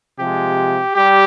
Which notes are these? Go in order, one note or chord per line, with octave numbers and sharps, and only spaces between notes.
C3 F3 G#3 G4
G3 G4